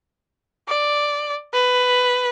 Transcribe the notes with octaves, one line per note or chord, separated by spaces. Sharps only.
D5
B4